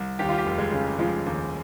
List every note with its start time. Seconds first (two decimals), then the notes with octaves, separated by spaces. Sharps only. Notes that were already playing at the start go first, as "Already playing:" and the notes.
Already playing: C2
0.19 D#2 G4
0.29 F4
0.38 G4
0.45 F1
0.58 G#3
0.72 C#3
0.99 F3 G#3
1.26 D#2